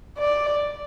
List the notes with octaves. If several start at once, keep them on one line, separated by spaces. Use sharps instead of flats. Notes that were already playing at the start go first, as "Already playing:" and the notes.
D5